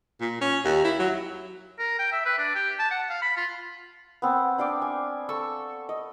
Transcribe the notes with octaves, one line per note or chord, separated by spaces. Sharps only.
A#2
C#4
D#2
E4
F#3
A#4
G5
E5
B4
D4
G4
A5
F#5
F5
B5
F4
B3 C4 A5
D4 F5 G5 D6
G#5
A4 C#6 E6
D#5